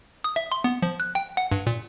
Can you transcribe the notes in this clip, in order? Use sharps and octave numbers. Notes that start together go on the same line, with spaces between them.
D#6
E5
C6
B3
F3
F#6
G5
F#5
G2
A#2